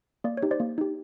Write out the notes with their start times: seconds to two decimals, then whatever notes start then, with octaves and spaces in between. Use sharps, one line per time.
0.24 A#3 D5
0.37 C#5
0.42 D#4 G4
0.51 C5 D5
0.60 A#3
0.78 D#4 G4